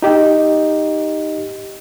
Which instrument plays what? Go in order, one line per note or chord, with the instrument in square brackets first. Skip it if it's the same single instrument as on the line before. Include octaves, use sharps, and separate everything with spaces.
[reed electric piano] D#4 G4 D#5